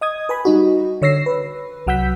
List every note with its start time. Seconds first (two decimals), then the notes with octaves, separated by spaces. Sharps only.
0.01 D#5 D#6 G#6
0.29 B4 G#5 B5
0.45 G3 D#4 F#4
1.02 D3 C#5 E6 A#6 C7
1.26 B4
1.87 C2 F#3 F#5 E6 G6 B6